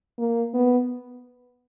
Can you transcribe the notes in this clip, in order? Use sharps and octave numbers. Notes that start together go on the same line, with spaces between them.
A#3
B3